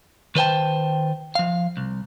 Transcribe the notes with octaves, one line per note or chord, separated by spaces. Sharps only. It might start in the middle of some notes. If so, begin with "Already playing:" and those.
D#3 B4 C5 G5 A5
F3 F5
C2